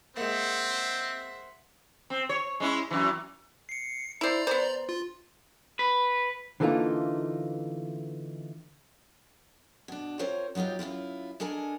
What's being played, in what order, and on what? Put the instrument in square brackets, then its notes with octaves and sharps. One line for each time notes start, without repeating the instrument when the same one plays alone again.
[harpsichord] G#3 A#3 [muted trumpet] C4 [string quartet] C5 E5 F#5
[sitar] C4
C#5
G#3 C#4 E4
F#2 E3
[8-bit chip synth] C7 C#7
[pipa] E4 C5 [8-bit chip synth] D5 A#5
[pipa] B3 C5
[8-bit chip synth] F4
[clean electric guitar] B4
[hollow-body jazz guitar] D3 E3 A3 A#3 D#4 F4
[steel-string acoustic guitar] B2 D4
C4 F4 A#4 C5 C#5
F#3 B3 D#4 F4 G4
F#2 A#2 E4 F4
G#3 D4 A4 A#4 G#5